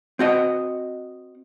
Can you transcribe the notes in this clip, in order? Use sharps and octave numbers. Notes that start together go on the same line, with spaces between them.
C4 F#4 D#5